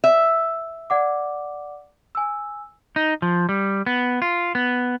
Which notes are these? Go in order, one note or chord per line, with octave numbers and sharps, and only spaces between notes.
E5
D5 F#5 D6
G#5 E6
D#4
F3
G3
B3
F4
B3